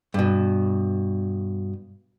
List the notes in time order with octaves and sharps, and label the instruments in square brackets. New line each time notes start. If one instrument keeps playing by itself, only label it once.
[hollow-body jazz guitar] G2 B2